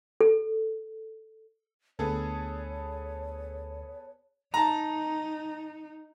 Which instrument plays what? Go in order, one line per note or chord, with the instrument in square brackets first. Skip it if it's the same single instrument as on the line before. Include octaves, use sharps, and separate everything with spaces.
[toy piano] A4
[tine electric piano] D2 [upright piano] B3 G#4 A4 [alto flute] C#5
[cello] D#4 [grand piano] A5 A#5